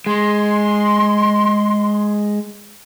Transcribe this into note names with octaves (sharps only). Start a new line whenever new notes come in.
G#3 C6